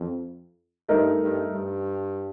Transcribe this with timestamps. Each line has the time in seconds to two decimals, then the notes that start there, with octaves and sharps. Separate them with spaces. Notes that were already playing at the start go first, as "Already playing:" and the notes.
Already playing: F2
0.89 G2 A3 D#4 A#4
1.21 G2
1.52 G2